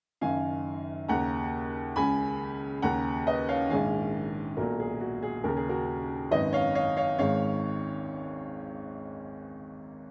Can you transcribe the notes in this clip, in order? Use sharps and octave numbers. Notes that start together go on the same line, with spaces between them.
F#1 F#2 D#3 F5 G#5
D#2 C#3 F#5 A#5
C#2 C#3 G#5 B5
D#2 C#3 F#5 A#5
B4 D#5
C#5 F5
A#1 G#2 D#3 F5 G#5
B1 A#2 F#4 A#4
G#4
F#4
G#4
D#2 C#3 A#4
G#4
F#4 A#4
G#1 F#2 D#3 B4 D#5
C#5 F5
C#5 F5
C#5 F5
G#1 G#2 D#3 C#5 F5